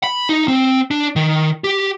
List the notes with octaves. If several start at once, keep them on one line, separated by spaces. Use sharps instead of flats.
B5
D#4
C4
D4
D#3
G4